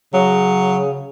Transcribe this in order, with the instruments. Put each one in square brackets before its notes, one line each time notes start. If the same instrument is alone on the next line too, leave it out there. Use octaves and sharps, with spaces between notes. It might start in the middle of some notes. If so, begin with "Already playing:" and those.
[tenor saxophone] C#3 [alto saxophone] F#3